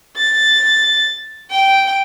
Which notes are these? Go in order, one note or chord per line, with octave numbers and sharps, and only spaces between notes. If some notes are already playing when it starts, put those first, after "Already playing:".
A6
G5